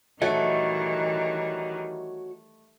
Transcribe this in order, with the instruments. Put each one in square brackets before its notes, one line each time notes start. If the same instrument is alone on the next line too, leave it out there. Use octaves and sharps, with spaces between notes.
[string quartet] D#3 E3 G3 [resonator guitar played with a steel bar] A3 [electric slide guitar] F#4 C#5 D#5